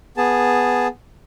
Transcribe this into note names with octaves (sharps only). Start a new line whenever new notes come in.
B3 G#4 A5